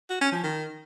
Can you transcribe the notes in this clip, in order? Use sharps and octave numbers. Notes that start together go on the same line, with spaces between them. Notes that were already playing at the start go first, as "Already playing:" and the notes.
F#4
C#4
F3
D#3